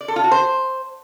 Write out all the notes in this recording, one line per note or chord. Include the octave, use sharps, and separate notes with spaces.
D5
A4
F4
F#4
C5